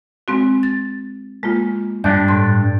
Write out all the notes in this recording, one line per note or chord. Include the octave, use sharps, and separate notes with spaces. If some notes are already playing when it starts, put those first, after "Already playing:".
G#3 C4 F#4
A6
G#3 A#3 F4
G2 D4 G6
A2 C6